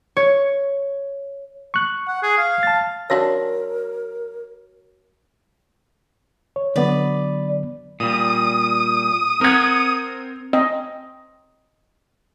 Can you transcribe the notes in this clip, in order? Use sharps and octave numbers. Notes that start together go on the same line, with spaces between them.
C#5
C#6 F#6
F#5
G#4
F5
A5 A6
F#3 D4 F4 F#4 A#4 C#5 E6 A#6
C#5
D3 F#3 B3 B4 D5
A#2 G3 D#6
C4 A#4 F#5 G#6
C4 D#5